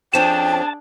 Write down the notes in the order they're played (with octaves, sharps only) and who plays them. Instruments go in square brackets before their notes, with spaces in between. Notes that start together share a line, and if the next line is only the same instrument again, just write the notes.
[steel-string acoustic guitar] F2 F3 C#4 [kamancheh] D4 G#4 [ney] G5 [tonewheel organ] A5